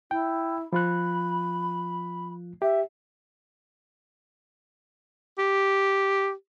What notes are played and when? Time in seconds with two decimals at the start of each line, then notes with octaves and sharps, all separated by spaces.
0.11 E4 G5
0.73 F3 F4 B5 F#6
2.62 G4 E5
5.38 G4